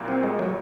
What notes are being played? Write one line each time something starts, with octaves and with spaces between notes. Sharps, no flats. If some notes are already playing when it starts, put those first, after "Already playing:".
Already playing: C2 A#2 F#3 A#3
C4
G#3
F#3